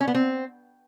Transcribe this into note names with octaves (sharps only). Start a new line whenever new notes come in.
C#4
B3
C4